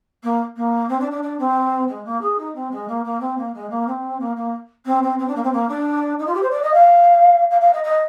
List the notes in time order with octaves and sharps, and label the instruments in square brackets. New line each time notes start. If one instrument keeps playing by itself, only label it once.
[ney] A#3
A#3
C4
D4
D4
D4
C4
G#3
A#3
G#4
D#4
C4
G#3
A#3
A#3
C4
A#3
G#3
A#3
C4
A#3
A#3
C4
C4
C4
D4
A#3
C4
A#3
D4
D#4
F4
G4
C5
D5
D#5
F5
F5
F5
D#5
D#5